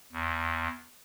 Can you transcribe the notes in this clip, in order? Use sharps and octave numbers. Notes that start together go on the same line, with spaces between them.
E2